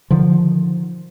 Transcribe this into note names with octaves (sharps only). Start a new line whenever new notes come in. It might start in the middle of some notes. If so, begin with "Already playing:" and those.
D3 D#3 F3